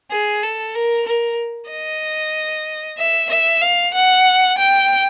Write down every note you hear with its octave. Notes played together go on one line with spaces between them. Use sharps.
G#4
A4
A#4
A#4
D#5
E5
E5
F5
F#5
G5